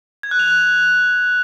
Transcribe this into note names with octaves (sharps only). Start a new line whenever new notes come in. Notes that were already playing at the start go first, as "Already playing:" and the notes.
G#6
F#6
F7
F#6